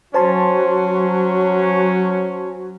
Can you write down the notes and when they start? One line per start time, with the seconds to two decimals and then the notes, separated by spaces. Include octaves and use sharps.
0.14 F#3 C#4 F#4 C5 A5 C6